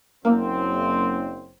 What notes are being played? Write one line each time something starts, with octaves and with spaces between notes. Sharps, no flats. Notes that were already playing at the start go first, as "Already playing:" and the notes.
F#1 A#3 C4